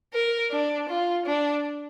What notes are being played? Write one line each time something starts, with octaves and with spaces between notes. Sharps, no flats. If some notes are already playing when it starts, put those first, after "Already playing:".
A#4
D4
F4
D4